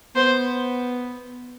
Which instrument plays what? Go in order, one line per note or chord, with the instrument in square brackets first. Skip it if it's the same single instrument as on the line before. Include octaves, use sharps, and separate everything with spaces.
[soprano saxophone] B3 [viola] C5